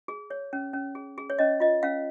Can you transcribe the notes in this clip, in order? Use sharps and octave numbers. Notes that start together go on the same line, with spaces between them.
G#4
C#5
C#4
C#4
G#4
G#4
C#5
C#4 D#5
F4 D#5
C#4 F5